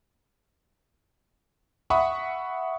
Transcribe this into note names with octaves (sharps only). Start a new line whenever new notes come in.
E5 F#5 B5 C#6 D#6